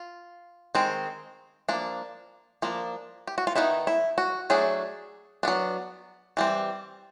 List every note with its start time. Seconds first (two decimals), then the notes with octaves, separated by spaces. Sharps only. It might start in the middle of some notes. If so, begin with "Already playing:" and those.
Already playing: F4
0.75 D#3 G#3 C4
1.68 F3 A#3 D4
2.62 F3 A#3 D4
3.27 G4
3.38 F#4
3.47 F4
3.55 D#3 G#3 B3 D#4 E4
3.87 E4
4.18 F#4
4.50 F#3 A3 D4 G#4
5.43 F#3 B3 D4
6.37 E3 G3 C4